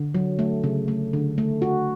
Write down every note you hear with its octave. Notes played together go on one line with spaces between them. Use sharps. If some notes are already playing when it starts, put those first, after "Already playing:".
Already playing: D3
F#3
A3
C#3
A3
D3
A3
F#4